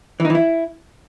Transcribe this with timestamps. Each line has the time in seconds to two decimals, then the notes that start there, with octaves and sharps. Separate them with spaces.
0.20 E3
0.25 D#4
0.30 E3
0.35 E4